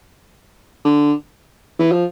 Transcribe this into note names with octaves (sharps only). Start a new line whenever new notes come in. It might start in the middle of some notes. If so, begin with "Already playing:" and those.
D3
E3
F3